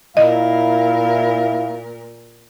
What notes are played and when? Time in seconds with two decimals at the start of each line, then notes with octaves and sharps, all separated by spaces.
0.17 A#2 E4 A#4 D#5 F5